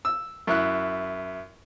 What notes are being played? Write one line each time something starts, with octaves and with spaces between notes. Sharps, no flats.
E6
F#2 E4 F#6